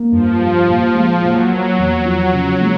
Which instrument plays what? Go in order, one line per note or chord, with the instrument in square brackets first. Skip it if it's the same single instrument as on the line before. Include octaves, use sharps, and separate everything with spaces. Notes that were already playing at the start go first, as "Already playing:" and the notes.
Already playing: [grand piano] A#3
[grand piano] G2 [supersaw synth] F3
[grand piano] G3
A#2
G#3
[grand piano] A#2 [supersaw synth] F#3
[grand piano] A#3
E2
F3
C#3
G#3